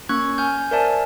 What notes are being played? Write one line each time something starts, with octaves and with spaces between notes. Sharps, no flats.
A#3 C#4 C#6 F#6 G#6
G#5 F6 G6
A#4 C5 D5 E5 G#5 A5